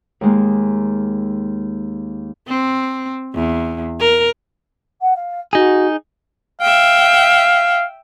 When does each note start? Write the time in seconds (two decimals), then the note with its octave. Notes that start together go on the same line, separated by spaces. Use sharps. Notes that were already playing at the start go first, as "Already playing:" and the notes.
0.21 D#2 G#3 A#3
2.48 C4
3.34 E2
4.00 A#4
5.01 F#5
5.16 F5
5.53 D#4 F#4 G#4
6.62 E5 F5 G5